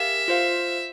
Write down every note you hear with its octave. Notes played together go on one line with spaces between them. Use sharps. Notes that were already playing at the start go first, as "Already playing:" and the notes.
Already playing: G4 A#4 E5 F5 G#5
F4 C5 F5